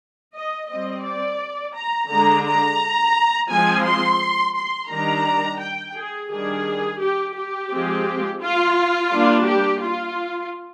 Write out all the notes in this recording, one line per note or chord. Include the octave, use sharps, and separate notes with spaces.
D#5
G3 C4 D#5
D5
A#5
D3 G#3 D4 A#5
A#5
F3 G#3 C4 G#5
C6
C6
D#3 G3 D4 A#5
G5
G#4
D#3 G3 D4 G#4
G4
G4
F3 G#3 C4
F4
G3 A#3 D4
G4
F4